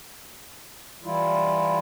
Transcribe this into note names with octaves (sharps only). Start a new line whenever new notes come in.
E3 G3 E4 F4